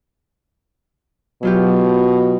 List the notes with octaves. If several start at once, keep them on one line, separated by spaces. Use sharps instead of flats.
B2 F#3 F4 G4